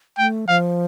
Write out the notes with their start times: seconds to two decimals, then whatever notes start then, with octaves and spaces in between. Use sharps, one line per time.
0.18 A3 G5
0.48 F3 F5